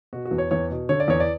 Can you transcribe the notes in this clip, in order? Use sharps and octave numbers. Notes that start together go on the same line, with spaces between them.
B2 F#4
F#4
E2
C#5
E2 C#5
B2
D3 C#5
D5
E2 C#5
D5